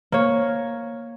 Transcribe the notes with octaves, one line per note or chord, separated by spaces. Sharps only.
A#3 C#5